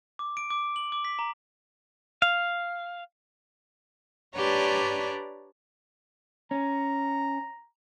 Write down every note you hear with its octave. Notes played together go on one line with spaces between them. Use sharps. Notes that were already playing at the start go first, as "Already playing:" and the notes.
D6
D7
D6
F#7
D6
B6
A#5
F5
D4 G4 B4 C#5 D5 A#5
C#4 A#5